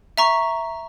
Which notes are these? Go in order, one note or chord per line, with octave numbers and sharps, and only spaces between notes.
E5 A#5 C#6